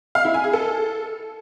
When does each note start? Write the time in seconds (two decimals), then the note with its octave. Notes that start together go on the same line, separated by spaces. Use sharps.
0.15 F5
0.25 E4
0.34 G#5
0.44 G#4
0.53 A4